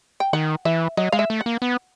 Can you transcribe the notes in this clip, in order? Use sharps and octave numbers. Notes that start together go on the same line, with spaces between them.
G5
D#3 F#5
E3 E5
F#3 D#5
G#3 F5
E5
A3
F#5
A#3
B3